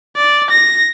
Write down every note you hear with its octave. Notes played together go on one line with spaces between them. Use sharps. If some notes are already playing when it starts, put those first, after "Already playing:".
D5
A#6